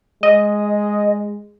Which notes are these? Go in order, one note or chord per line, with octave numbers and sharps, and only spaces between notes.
G#3 D#5